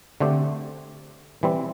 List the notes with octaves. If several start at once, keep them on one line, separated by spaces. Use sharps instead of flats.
D3 A3 C4 G4
E3 G3 C4